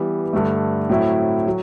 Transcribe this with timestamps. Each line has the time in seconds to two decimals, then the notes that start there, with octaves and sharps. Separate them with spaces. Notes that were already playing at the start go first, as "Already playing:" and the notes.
Already playing: E3 G3 B3
0.33 G2 D3 A3
0.89 A2 F#3 C4 E4
1.47 F#3